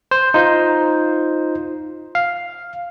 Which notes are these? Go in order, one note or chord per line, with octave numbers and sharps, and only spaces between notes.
C5
D#4 F4 C5
F5